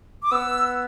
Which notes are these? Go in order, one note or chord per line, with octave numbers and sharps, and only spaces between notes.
D6
B3 E6